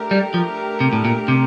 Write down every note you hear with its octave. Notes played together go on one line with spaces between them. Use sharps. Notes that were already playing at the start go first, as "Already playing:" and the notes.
Already playing: A3 D4 G4 A#4
G3
F3
C3
A2
A#2
C3